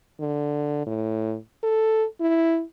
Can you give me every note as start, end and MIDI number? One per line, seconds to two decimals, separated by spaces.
0.21 0.84 50
0.87 1.36 45
1.63 2.05 69
2.21 2.63 64